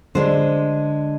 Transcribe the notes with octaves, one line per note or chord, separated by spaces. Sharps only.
D3 G#3 D4 C5